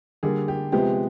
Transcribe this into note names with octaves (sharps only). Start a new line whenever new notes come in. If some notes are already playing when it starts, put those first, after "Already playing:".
D3 G3 A#3 G#4
G4
C3 F3 G#3 B3 G4